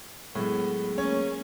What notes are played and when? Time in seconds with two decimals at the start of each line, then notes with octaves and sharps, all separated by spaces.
0.35 A2 F#3 G#3 A3 B3 G#4
0.98 A#3 C#4 C#5